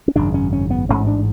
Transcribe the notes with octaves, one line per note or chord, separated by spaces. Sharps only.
C#4
G#1 F#2 C#3 D4
C#4
C#4
B3
A1 G#2 C#4
D4